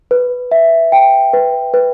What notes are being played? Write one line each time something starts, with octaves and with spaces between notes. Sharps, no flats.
B4
E5
G5
B4
B4